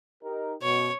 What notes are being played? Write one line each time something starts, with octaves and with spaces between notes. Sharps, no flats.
D#4 G4 A#4
F#2 B2 C#5